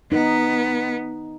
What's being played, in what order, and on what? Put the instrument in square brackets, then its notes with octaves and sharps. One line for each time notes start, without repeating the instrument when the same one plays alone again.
[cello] B3 [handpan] D#4